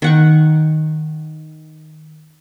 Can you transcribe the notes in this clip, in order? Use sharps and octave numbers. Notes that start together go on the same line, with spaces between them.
D#3 F#5 C#6